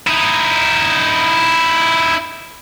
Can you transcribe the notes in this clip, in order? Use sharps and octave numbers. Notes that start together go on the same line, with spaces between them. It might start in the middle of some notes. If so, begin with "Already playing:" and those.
D#4 E4